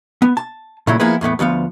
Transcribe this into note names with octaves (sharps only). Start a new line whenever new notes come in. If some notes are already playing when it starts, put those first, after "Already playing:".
B3
A5
A#2 C#3 F#3 A3 E4
F3 A#3 B3 E4 G#4 B4
E2 A2 A3 B3
D2 F3 B3 F5